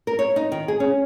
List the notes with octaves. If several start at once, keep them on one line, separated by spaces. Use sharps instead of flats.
A#4
C#5
D#4
D#3
G#4
C#4